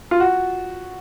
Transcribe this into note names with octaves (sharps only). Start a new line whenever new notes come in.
F4
F#4